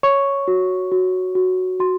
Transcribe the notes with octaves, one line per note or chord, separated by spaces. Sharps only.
C#5 C#6
F#4
F#4
F#4
F#4 C6